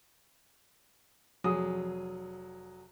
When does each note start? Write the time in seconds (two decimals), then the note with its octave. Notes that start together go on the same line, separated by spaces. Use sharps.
1.44 F1 F#3 G#4 D#6